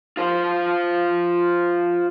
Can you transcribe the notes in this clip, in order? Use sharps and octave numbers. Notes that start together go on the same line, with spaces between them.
F4 C5